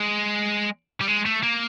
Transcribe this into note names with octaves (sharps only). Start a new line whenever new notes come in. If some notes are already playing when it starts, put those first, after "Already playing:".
Already playing: G#3
G3
G#3
A3
A#3